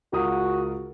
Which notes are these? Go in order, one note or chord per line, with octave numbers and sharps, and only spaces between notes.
C#2 F#4 A#4 D#6